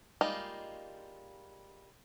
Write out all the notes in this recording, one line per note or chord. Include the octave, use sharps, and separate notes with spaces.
G3 G#3 A#3 D#4 F4